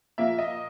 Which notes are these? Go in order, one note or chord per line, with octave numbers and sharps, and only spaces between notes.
A#2 F3 A#3 E5
D#5